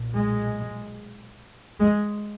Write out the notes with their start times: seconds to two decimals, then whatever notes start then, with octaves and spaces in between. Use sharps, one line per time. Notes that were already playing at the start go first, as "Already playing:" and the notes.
Already playing: B1 A#2
0.15 G#3
1.80 G#3